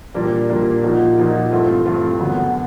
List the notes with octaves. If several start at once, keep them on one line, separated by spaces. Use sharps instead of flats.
A#2 G3 A#3 D4
A#2 G3 A#3 D4
A#2 F3 A#3 D#4 F#4
A#2 F3 A#3 D#4 F#4
G2 E3 A3 C4 F4
G2 E3 A3 C4 F4
F#2 D3 F#3 B3